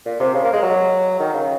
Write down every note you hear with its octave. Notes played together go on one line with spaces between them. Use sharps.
A#2
C3
C#3
A#3
G#3
F#3
D#3
C#3